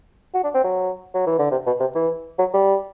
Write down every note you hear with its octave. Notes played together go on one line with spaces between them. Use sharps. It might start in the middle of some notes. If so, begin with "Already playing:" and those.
F#4
D4
C4
F#3
F#3
E3
D3
C3
B2
C3
E3
F#3
G3